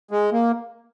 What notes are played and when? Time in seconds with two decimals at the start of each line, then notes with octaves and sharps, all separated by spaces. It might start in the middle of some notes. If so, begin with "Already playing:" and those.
0.11 G#3
0.33 A#3